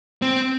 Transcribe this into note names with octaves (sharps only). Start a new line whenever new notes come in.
C4